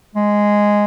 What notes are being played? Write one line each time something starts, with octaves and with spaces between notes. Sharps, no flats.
G#3